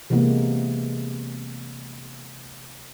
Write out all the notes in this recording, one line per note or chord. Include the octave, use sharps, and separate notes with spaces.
C3 E3 G#3 A#3 B3